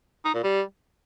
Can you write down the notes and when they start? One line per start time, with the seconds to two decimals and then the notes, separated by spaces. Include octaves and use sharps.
0.25 D#4
0.34 A#2
0.43 G3